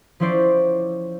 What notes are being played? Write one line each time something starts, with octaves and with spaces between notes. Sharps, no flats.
F3 C#4 E4 C5 D5 C7